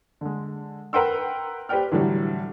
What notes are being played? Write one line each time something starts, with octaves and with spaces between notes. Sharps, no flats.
D3 G#3
A#4 B4 F#5 G5 C6 E6
G4 B4 C5 D5 G5 F6
A2 D3 E3 F#3 G3